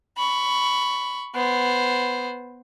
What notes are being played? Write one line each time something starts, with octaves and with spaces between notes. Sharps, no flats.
B5 C#6
B3 C5